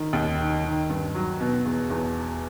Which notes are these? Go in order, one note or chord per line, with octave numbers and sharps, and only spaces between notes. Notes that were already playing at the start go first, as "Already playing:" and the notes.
Already playing: D#3
D#2
D#3
D#3
G2
F#3
B2
E2
E2